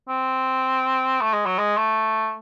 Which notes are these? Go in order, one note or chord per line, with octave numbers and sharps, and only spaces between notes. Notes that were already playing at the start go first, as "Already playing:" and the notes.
C4
A3
G#3
F#3
G#3
A3